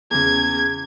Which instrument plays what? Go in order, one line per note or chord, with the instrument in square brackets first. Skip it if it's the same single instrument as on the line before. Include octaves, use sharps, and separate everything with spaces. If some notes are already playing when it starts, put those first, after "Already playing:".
[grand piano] E2 C#3 [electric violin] G#6